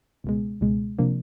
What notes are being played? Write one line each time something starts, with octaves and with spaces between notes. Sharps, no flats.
C#2 B2 G#3
C#2 B2 G#3
C3 F3 A#3 D4